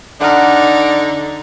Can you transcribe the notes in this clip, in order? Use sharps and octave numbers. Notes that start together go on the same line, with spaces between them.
D3 D#4 D5 F#5 F6